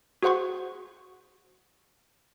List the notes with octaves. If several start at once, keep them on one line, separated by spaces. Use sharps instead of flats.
F#4 G#4 C5 F#5 C6 C#6